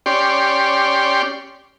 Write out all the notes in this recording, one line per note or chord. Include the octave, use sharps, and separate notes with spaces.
C#4 G4 D5 C6